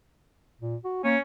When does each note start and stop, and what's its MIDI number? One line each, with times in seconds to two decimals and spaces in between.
0.61 0.76 46
0.84 1.02 66
1.04 1.16 58
1.04 1.18 61